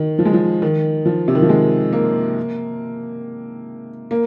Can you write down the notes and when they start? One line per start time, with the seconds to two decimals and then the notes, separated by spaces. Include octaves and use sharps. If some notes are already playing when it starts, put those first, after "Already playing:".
Already playing: D#3
0.19 F3
0.26 G#3
0.33 F3
0.62 D#3
1.06 F3
1.28 C3
1.35 D#3
1.42 F3
1.49 G#3
1.93 A#3
4.11 A#3